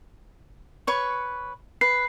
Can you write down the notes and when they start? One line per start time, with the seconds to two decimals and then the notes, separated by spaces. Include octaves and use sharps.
0.87 B4 C#5 C#6
1.81 B4 C7